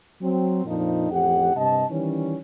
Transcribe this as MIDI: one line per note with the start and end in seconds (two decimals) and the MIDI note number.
0.21 0.62 54
0.21 0.62 60
0.65 1.09 41
0.65 1.09 46
0.65 1.09 53
0.65 1.09 62
0.65 1.09 63
1.11 1.55 33
1.11 1.55 41
1.11 1.55 67
1.11 1.55 78
1.56 1.84 43
1.56 1.84 48
1.56 1.84 75
1.56 1.84 81
1.91 2.36 51
1.91 2.36 52
1.91 2.36 55
1.91 2.36 61